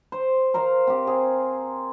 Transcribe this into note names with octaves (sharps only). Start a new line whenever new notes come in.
C5
A#4 C5 F5 A#5
C4 G4
C4 G#4